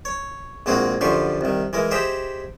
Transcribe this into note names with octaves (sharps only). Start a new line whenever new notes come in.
C#5
A#1 G#3 A#3 C4 F#4 G#4
F#2 D3 F3 G4 C6 C#6
C2 D#3
E3 G#3 A#4
G4 G#4 C5 D#5 E5 G5